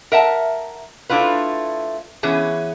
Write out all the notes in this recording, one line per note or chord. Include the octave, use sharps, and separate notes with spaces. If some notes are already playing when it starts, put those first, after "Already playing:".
A#4 E5 F#5 A5
A3 D4 E4 F4 B4
E3 B3 C#4 G#4